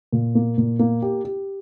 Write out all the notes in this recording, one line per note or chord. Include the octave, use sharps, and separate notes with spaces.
A#2
A#3
A#2
A#3
G4
G4